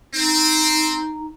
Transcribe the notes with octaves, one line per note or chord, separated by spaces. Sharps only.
C4 D#4